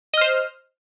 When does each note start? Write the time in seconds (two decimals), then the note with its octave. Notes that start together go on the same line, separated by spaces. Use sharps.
0.14 D#5
0.17 F6
0.21 C5